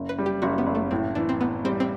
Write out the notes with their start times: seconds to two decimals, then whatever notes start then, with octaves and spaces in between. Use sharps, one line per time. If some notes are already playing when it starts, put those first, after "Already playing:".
Already playing: F#1
0.09 B4
0.18 G3
0.26 G4
0.42 F#1 F#4
0.58 B3
0.67 F#1
0.75 A3
0.91 A2 C4
1.15 E3 D4
1.29 C4
1.41 A2 B3
1.64 G3 C4
1.80 C4